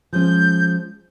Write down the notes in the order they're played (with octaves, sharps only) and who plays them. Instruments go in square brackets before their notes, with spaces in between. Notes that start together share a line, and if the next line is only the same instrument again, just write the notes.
[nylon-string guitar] F3 G#3 C#4 [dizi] G6